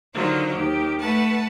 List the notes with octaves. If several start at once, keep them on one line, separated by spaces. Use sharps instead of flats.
D3 D#3 F#3 F4 C5
D#2 D#3 G4
A3 B4 F#5 A5